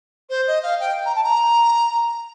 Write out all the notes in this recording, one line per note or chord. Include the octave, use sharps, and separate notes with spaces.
C5
D#5
F5
G5
A#5
A5
A#5